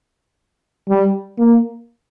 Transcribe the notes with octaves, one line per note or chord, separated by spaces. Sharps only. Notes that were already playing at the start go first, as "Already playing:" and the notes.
G3
A#3